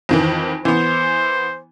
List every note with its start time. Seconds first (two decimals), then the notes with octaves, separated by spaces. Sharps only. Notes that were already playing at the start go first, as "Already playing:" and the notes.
0.09 F2 D#3 E3
0.65 E3 B3 C5